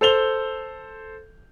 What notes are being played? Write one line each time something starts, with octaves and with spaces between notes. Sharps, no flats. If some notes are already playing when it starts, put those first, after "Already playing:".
A4 C5 F7 G7